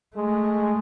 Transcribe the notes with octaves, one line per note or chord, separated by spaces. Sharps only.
G#3 A3